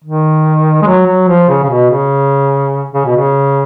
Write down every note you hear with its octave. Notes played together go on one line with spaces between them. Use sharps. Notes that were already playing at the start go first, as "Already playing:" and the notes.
D#3
G#3
F#3
F#3
F3
C#3
C#3
B2
C#3
C#3
B2
C#3